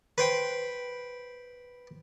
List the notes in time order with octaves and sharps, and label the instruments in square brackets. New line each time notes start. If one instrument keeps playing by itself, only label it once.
[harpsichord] B4 C5 G5